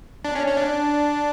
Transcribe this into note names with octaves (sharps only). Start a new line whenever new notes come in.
D4
C#4
C#4
D4